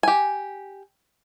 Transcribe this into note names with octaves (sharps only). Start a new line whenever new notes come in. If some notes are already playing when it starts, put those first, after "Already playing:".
G4 G#5